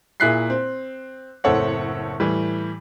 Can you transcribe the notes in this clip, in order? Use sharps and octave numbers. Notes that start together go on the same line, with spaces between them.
A#2 E4 G#4 F#6 B6 C7
C4
F#1 A2 C4 A4 C#5 F#5
A2 E3 G3